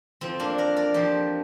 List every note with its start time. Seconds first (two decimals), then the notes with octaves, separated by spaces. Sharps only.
0.21 F2 F3 C4
0.39 A#3 D4
0.58 A#4 D5
0.76 A#4 D5
0.94 F2 F3 G4 C5